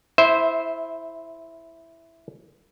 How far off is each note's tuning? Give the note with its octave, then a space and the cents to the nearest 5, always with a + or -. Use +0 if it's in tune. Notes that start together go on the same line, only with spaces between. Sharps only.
E4 +0 C5 +0 E5 -20